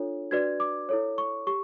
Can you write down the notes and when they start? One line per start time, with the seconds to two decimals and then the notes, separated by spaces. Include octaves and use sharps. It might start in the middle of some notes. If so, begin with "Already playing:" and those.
Already playing: D4 F4 A4 C#5
0.31 D4 F#4 B4 D5 G#6
0.60 D6
0.89 E4 A4 C#5
1.18 C#6
1.47 G4 C#6